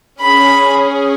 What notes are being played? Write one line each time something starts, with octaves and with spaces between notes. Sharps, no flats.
C#4 G#4 B5